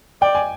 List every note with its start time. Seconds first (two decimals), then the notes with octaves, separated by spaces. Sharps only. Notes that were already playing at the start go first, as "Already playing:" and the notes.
0.22 D5 G5
0.35 G#5